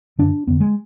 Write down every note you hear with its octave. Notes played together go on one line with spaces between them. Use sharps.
F#2 D3 D4
F2 D3 B3
G#3